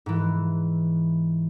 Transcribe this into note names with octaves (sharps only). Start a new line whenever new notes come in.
G#2 E3